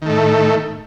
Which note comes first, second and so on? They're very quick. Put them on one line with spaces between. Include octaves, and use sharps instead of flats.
D#3 A3 A2